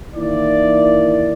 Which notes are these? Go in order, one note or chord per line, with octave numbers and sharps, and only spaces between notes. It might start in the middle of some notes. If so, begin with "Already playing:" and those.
D#3 E3 A#3 E4 D5